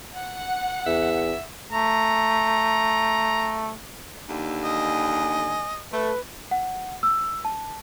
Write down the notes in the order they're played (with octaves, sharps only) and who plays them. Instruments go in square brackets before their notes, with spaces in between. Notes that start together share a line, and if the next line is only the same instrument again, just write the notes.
[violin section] F#5
[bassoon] E2 [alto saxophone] E5
[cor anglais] A3 [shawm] A#5
[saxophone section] D#2 D3
[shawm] D#5 [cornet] G#5
[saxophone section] A3 [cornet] B4
[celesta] F#5
E6
A5